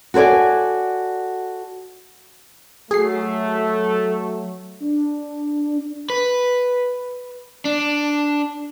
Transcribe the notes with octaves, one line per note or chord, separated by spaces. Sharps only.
F#4 A4 C5 D5 G#5
F#3 A3 G#4 C7
D4
B4
D4